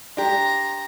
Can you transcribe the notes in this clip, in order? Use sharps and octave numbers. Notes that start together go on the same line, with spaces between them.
D4 G4 A#5 C6